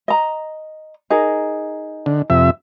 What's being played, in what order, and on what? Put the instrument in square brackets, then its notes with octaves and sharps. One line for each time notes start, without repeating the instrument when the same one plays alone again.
[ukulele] D#5 A#5
D#4 G#4 A#4
[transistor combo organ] D3
F2 C3 E5